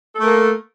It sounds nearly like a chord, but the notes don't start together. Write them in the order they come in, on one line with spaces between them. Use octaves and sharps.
A4 A3 A#4 A#3